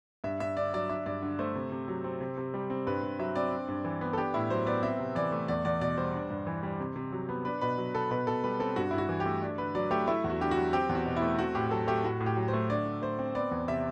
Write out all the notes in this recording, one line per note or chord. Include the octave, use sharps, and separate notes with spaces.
G2 E5
G2 E5
D3 D5
F#3 D5
D4 E5
G2 D5
D3
A3 C5
C3
C3
F#3
C4
C3
C3
G3
C4
G2 B4
G2
F#3 E5
C4 D5
D4
G2
E3
B3
A4
D4 G4
A2 E4
F#3 C5
B3 D5
C4 E5
C3
E3 D5
A3
E2 D5
E2 D5
B2 D5
G3 C5
D4
G2
E3
G3
C3
C3
F#3
B3
D4 B4
B2 B4
F#3
B3 A4
B2 B4
B2 A4
G3 B4
C4 A4
G2 F#4
G2 E4
F#4
E3
G4
A3
D4
D3 B4
F#3 D5
A3 G4
A3 E4
E2
F#4
D3 G4
F#4
F#3
C4 G4
E2
F#4
B2
E4
A3
C4 F#4
A2 G4
F#3 A4
A3 G4
A2 F#4
A2
G4
F#3
C5
A3
D3 D5
D3
A3 C5
C4
B3 D5
E2
C3 E5